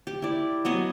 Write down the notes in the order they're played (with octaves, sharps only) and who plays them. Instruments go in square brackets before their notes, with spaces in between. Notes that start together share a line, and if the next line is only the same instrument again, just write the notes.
[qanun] G4
E4 D5
F#3 B3 C#5 D#5